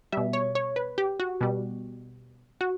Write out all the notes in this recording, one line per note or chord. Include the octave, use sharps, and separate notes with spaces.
B2 G3 E5
C#5
C#5
B4
G4
F#4
B2 G3
F#4